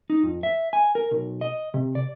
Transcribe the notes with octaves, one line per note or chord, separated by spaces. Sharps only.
D#4
F2
E5
G#5
A#4
B1
D#5
C3
D5